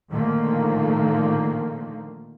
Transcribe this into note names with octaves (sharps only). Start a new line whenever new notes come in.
A#2 D3 D#3 F3 A3 A#3